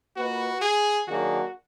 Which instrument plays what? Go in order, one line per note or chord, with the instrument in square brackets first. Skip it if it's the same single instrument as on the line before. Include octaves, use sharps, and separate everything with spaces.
[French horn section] A#3 F4 B4 D#5 [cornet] F#4
[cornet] G#4
[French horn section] D#3 F#3 A#3 D4 G#4 [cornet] F#4